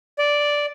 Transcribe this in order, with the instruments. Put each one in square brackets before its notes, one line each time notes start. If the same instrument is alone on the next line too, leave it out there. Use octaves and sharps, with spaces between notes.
[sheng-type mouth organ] D5